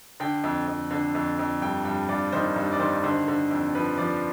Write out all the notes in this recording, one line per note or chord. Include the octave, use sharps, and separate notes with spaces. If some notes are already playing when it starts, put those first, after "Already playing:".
D3 G5
F2
F2
D3
F2
F2
G2 G5
G2 G5
G2 D5
D#3 C5
G2
D5
D#3 C5
D3 C5
D3
F2
F3 B4
F3 D5